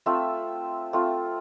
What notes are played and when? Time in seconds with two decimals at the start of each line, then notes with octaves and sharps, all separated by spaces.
0.06 A3 C4 F4 E5
0.93 A3 C4 F4